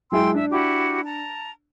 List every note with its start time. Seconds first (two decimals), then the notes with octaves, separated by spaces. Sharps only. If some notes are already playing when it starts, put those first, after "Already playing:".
0.12 F#3 G#3 E4 G5 C6 E6
0.34 D4 E5
0.51 E4 F#4 G4
1.04 A5 A#5